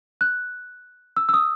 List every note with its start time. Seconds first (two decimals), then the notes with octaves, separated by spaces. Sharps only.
0.21 F#6
1.17 E6
1.29 E6
1.34 D#6